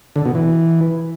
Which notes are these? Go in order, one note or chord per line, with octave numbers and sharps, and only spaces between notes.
D3
B2
E3